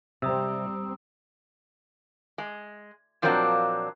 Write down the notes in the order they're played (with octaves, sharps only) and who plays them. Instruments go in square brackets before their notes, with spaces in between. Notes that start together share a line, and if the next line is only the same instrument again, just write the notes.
[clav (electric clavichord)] C3 [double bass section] G3 C4 [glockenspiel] A#5 D#6 E6
[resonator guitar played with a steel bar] G#3
A#2 F3 F#3 A#3 C4 D4